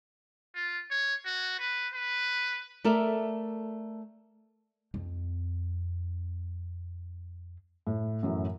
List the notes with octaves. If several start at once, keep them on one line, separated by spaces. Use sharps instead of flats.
F4
C#5
F#4
B4
B4
A3 A4 A#4 D5 E5
F2 C4
A2
F#2 A2 E3 F#3